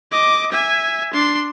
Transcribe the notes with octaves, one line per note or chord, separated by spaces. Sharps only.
D#5 D6
E5 G#5
D4 C6